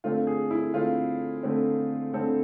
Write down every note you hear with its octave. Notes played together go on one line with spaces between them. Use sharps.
D3 A3 C4 F4
G#4
E4
D3 A3 C4 F4
D3 A3 C4
D3 A3 C4 A4